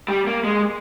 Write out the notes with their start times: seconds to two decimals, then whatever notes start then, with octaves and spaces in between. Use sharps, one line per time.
0.08 G3
0.27 A#3
0.44 G#3